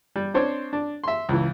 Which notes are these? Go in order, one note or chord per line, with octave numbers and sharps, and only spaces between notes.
G3
C4 D4 C5 C#5
D4
E5 C6
C#2 E3